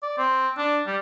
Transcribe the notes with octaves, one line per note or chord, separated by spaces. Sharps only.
D5
C4
D4
G3